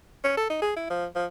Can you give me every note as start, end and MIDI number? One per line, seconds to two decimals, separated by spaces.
0.24 0.34 61
0.37 0.45 69
0.50 0.60 63
0.62 0.71 68
0.76 0.86 64
0.90 1.06 53
1.15 1.26 53